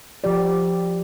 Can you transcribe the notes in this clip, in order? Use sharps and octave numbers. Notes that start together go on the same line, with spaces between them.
F3 G4 D5